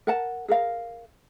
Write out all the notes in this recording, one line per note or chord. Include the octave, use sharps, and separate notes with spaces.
A#4 F#5 A5
G#4 A#4 F5